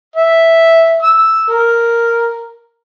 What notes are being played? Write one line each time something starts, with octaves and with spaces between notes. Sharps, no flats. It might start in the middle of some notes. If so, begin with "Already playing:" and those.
E5
E6
A#4